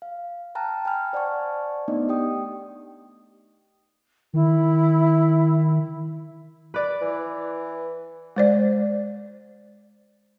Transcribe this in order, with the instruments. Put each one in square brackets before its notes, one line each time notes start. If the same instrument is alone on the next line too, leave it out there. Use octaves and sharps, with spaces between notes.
[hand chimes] F5
G5 A5 A#5 F6 F#6
G5 G#5 B5 F6
C5 D5 F#5 A5 C#6
A3 B3 D4 D#4 D5 D#5
G4 G5 D#6
[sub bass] D#3 [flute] E4
[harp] B4 D5
[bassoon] E3
[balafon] G#3 C5 D5